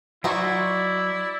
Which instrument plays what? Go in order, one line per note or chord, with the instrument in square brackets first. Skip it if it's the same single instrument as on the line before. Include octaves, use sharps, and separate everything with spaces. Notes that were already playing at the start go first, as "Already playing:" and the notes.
[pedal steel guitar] F#3 C#6 [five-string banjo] D#4 F#4 C5 [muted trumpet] E4 [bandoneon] D5